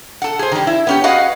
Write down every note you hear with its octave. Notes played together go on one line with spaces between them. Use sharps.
A4 F#5
G#4 C5
D#3 G3
E4
B3 C#4 G4
F#4 G#4 B4 D#5 F5 F#5